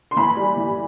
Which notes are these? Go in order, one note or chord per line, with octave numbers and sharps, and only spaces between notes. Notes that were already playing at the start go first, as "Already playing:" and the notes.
C6
E3 B5
G3
E3